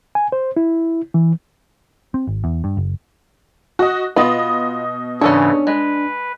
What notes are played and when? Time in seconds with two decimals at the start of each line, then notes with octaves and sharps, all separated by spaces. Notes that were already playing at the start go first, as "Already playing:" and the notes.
0.15 G#5
0.32 C5
0.57 E4
1.14 E3
2.14 C4
2.27 G#1
2.44 E2
2.64 G2
2.77 F#1
3.79 F#4 D#5
4.16 B2 B3 F4 B4 D#5
5.21 G#2 C#3 E3 C#4 D4 A4 C#5
5.67 G#3 B4